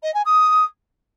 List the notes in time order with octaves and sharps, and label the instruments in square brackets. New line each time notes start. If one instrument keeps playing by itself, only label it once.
[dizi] D#5
G#5
D#6